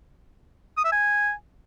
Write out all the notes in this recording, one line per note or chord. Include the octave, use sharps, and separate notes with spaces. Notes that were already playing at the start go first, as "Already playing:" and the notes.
D#6
E5
G#5